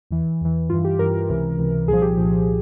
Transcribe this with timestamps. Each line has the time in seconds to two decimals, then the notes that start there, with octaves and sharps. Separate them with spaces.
0.11 E2 E3
0.41 E2 E3
0.70 G2 E3 F4
0.84 G4
0.99 G2 E3 A#4
1.29 C#2 C3 E3
1.58 C#2 C3 E3
1.88 C2 A#2 F3 G#4
2.02 G4
2.17 C2 A#2 F3